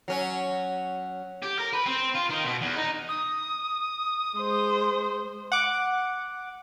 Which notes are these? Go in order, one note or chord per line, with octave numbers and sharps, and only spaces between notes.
F#3 C#4
G4
A#4
B4
C4
F4
D#3
B2
E2
D#4
D#6
G#3 C5
F#5 D6